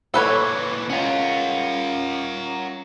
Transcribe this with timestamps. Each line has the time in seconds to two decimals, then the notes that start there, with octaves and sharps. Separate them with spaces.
0.14 A#2 E3 A4 B4 C#5
0.90 C#4 F4 A#4 F#5